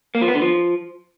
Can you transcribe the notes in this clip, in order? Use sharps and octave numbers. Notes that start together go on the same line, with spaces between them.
A#3
F3
B3
D3
F3